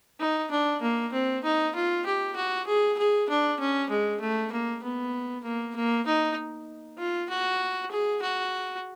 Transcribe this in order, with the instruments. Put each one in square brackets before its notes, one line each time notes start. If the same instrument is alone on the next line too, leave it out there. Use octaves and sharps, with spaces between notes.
[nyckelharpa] D#4
D4
A#3
C4
D#4
F4
G4
F#4
G#4
G#4
D4
C#4
G#3
A3
A#3
B3
A#3
A#3
D#4
F4
F#4
G#4
F#4